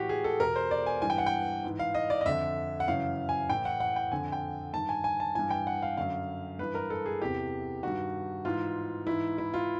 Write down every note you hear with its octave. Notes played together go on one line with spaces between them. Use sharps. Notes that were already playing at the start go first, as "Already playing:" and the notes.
Already playing: A2 E3 F#4 G4
G#4
A4
E2 B2 A#4
C5
D5
G#5
G2 E3 G#5
G5
F#5
G5
G#2 E3
F5
D#5
D5
D#5
F2 D3 E5
F#5
F#2 C#3 E3 F5
G#5
A2 E3 G5
F#5
F#5
G5
F2 D3 G#5
G5
G2 D#3 A5
G#5
G#5
A5
G2 E3 G#5
G5
F#5
F5
F#2 D3 F5
G2 E3 B4
A#4
A4
G#4
E2 C3 E3 G4
G2 D#3 F#4
G#2 E3 F4
G#2 E3 E4
E4
F4